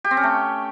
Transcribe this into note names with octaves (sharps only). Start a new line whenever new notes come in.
G4
C4
C#4
A3